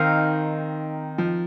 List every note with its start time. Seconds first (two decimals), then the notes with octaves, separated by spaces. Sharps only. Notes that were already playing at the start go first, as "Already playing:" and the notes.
Already playing: D#3 C4 D#4 A#4 F5
1.18 F3